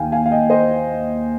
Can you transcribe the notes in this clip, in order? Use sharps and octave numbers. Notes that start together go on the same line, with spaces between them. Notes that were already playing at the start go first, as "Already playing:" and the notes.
Already playing: D#2 D#3 F5 G5 G#5
F5 G#5
F5
D#5 G5
C5 D#5